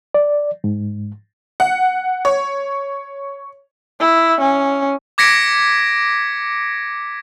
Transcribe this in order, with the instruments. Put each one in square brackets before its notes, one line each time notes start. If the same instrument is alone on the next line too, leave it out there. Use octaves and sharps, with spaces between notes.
[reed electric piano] D5
G#2
[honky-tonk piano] F#5
C#5
[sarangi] E4
C#4
[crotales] D6 G#6 A#6 B6 C#7 D7